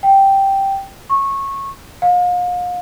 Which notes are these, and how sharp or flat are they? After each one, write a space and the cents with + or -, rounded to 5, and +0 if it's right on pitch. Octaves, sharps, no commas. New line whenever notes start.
G5 -5
C#6 -15
F5 +40